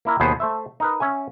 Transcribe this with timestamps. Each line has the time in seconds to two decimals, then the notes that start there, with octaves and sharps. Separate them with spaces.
0.05 A#3 E4 A#4 A#5
0.20 D#2 B2 B3 G#4 C5
0.40 A3 C5 E5
0.80 D#4 A#4 B4
1.00 C#4 E5 G#5